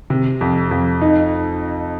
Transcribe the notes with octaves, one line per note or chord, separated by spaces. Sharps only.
C3
F2
F2
D#4